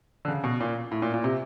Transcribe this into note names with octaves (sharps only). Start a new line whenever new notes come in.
D3
C#3
B2
A#2
A2
A#2
A#2
C3